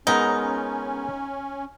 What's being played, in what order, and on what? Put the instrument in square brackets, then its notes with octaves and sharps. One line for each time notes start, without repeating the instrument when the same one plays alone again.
[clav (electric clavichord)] G#3 B3 A#4 [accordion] C#4 [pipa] D#4